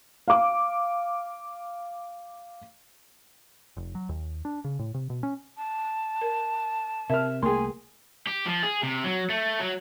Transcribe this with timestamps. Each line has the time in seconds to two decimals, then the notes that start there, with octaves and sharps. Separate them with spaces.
0.28 F5 D6
3.77 F1
3.95 F#3
4.09 D#2
4.45 D4
4.64 C#3
4.79 A2
4.94 C3
5.10 B2
5.23 C#4
5.57 A5
6.21 A#4
7.10 C3 A#4 E5 F6
7.43 C2 A3 A#3 G#4 A#4 G5 G#5 C6
8.27 G4
8.46 F3
8.63 G#4
8.83 C3
9.04 F#3
9.30 A3
9.59 F#3